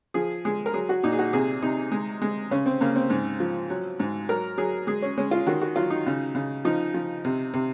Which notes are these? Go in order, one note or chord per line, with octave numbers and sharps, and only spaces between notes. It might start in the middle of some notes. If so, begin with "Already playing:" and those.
F3 G#4
G#3 G#4
A#4
F#3 G#4
F#4
A#2 D#4
G#4
F#4
C3 G#4
C3 D#4
G#3
G#3
C#3 C#4
C4
C#3 A#3
C4
G#2
F3
F#3
G#2
F#3 A#4
F#3 G#4
G#3 G#4
C#4
G#3 C#4
F4
D#3 F#4
F#4
F#3 F4
D#4
C#3
C#3
F3 D#4
F3
C3
C3